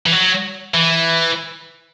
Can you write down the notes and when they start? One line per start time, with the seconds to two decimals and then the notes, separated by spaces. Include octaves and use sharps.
0.06 E3
0.12 F#3
0.74 E3